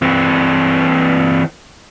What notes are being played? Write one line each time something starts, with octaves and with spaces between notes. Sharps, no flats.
E3 C4